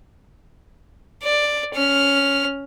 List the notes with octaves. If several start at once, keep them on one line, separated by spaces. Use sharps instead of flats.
D5
C#4 F6